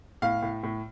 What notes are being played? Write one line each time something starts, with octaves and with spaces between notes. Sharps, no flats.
A2 F5
A2
A2